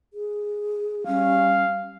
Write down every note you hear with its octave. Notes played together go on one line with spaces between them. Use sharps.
G#4
G3 C#4 F5